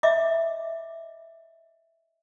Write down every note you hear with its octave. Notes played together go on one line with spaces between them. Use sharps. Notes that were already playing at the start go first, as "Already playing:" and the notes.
D#5 E5 D6